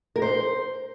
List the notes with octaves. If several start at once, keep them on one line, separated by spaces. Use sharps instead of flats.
A#4
C5